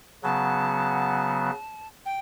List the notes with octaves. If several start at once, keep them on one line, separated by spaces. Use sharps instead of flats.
C#3 F#3 B3 A5
G5